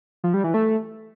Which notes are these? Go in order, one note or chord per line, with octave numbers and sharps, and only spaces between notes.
F3
G3
E3
A3